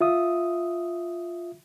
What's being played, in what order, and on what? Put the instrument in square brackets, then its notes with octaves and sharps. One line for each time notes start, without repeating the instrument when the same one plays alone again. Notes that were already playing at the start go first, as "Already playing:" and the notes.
[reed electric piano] F4 E5 D#6